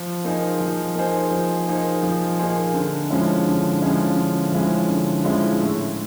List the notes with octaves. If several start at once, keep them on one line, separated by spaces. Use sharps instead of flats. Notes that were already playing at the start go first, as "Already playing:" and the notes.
Already playing: F3
A#3 D#4 G#4 C5
F3
A#3 D#4 G#4 C5
F3
A#3 D#4 G#4 C5
F3
A#3 D#4 G#4 C5
D3
F3 G#3 C#4 E4
D3
F3 G#3 C#4 E4
D3
F3 G#3 C#4 E4
D3
F3 G#3 C#4 E4
A2